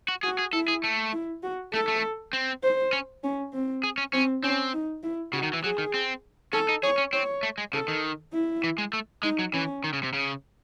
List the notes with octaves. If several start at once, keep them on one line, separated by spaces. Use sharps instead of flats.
F#4
F#4 G#4
G#4
E4 A4
G#4
A3
E4
F#4
A3 A4
A3
C4
C5
C#4
C#4
C4
G#4
C#4
C4 C#4
C4 C#4
D#4
E4
C#3 F#4
D#3
E3
F#3 G#4
D#3
C4
C#4 A4
D#4
G#4 C#5
C#4
C4 C#5
A3
G#3
C#3 A4
D#3
E4
E3
G#3
A3
G#3 D#4
F#3
E3 C#4
D#3
C#3
C3
C#3